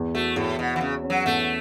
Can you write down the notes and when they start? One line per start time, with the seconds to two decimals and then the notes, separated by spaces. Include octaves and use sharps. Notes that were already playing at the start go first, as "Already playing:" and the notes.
Already playing: E2
0.15 A3 F#4
0.36 E2 A2
0.58 B2 F#4
0.76 E3
0.81 C#3 C#4
1.04 C#4
1.10 F#3
1.26 E2 A3